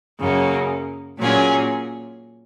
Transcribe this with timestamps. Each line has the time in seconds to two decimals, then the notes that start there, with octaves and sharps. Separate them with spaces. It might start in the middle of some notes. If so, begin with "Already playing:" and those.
0.20 F#2 C#3 A#3
1.19 A#2 F#3 C#4 G#4